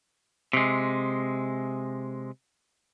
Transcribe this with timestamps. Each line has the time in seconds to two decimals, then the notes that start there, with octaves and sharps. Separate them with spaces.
0.53 C3 G#3